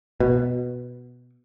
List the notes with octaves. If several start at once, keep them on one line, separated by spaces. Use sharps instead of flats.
B2